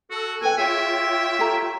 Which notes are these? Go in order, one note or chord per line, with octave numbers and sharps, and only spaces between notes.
F#4 A4
A#2 C#3 A4 B4 G5 G#5 F#6
F4 G#4 C#5 E5 G5
G4 A4 A#5